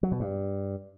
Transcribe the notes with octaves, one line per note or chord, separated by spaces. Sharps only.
F#3
B2
G2